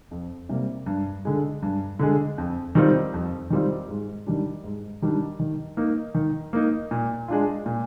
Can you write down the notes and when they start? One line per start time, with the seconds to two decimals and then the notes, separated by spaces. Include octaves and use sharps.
0.11 F2
0.49 C3 G3 A#3
0.86 G2
1.25 D3 G#3
1.63 G2
1.99 D3 G#3
2.38 F2
2.75 D#3 G3 C4 F4
3.14 F2
3.50 D#3 G3 C4 F4
3.89 G#2
4.26 D#3 G3 D4
4.64 G#2
5.02 D#3 G3 D4
5.40 D#3
5.77 A#3 D#4
6.15 D#3
6.53 A#3 D#4
6.91 A#2
7.28 G#3 D4 F4
7.66 A#2